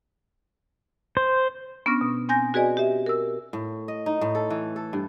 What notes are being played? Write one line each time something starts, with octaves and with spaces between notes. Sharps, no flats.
C5
B3 C#4 D4 C#6 F6 A#6
B2
C4 G#5 G6 A#6
F#4 G#4 B4 D5 D#5 G#5
G4 E5
A#4 E6
A2
D#5
D#4
A2
A4
E3
A4
G2